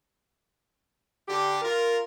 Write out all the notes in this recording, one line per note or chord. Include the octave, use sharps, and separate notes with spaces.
D3 G4
F4 A#4